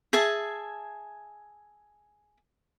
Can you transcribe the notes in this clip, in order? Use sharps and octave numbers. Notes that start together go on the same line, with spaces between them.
G#4 E5 G#5 A5